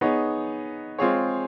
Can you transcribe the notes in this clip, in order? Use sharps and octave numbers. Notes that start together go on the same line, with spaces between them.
B3 D#4 G#4 C#5
G#3 C4 F4 G#4 C#5